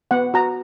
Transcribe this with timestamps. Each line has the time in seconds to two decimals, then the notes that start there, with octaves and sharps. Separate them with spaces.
0.11 B3 F#5
0.34 F#4 A#5